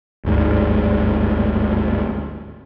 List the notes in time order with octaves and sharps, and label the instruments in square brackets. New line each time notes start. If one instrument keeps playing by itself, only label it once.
[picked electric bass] G1 D2 G#2